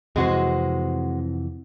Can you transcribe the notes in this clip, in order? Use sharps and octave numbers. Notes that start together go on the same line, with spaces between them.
F2 C3 E3 G#3 F#4 C5